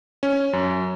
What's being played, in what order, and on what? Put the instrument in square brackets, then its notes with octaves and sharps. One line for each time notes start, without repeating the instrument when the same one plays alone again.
[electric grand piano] C#4
F#2